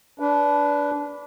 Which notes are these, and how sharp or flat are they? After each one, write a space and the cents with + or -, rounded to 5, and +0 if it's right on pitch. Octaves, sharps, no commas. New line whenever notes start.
D4 -20 B4 +0